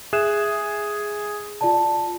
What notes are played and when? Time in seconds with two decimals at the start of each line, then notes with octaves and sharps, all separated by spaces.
0.13 G#4 E5 F#6 E7
1.61 F4 D5 A5